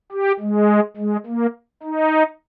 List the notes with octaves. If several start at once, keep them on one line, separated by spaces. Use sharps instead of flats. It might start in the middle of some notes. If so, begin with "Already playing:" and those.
G4
G#3
G#3
A#3
D#4